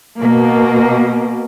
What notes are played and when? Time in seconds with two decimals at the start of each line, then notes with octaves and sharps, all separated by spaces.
0.21 B2 A#3